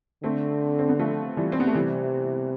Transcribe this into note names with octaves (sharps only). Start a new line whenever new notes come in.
D3 A3 C4
C4
B3
F3 A3
E3 G3
C4
B3
A3
C3 E3 G3